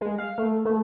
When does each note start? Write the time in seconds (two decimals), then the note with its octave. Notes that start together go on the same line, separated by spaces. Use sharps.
0.01 G#3
0.18 F5
0.38 A3
0.65 A3